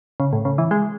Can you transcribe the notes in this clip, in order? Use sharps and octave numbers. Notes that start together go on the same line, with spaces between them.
C#3
A2
C#3
E3
G#3